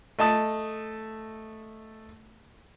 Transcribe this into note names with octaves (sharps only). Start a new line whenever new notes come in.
A3 D#5 A5 D#6